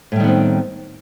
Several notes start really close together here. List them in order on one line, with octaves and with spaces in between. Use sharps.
A2 G3 D#3 B3 C4